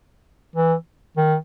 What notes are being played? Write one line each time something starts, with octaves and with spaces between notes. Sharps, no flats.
E3
D#3